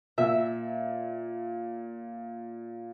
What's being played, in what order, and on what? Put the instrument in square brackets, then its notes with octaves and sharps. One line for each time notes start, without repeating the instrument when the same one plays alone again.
[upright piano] A#2 [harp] E5